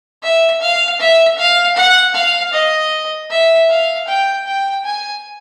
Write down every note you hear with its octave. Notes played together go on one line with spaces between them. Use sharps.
E5
F5
E5
F5
F#5
F5
D#5
E5
F5
G5
G5
G#5